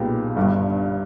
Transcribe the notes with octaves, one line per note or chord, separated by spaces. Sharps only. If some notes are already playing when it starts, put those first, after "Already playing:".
Already playing: B1 A#2 G#3 B3 G4
G1 G2 G3